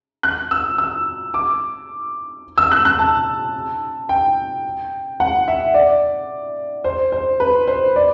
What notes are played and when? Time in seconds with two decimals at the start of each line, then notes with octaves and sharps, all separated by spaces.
0.23 F#6
0.51 E6
0.78 E6
1.34 D6
2.58 E6
2.71 F#6
2.85 F#6
2.99 A5
4.09 G5
5.20 F#5
5.48 E5
5.74 D5
6.84 C5
7.12 C5
7.40 B4
7.67 C5
7.96 D5